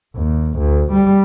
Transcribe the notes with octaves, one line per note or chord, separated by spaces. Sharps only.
D#2
D2
G3